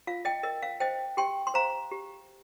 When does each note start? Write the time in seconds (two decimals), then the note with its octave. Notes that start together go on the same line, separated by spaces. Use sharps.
0.07 F4 F5
0.25 D#5 G5
0.43 A#4 D#5
0.62 F5
0.80 C5 D#5 G5
1.17 G4 G5 C6
1.47 C6
1.54 C5 F5 A#5
1.91 G4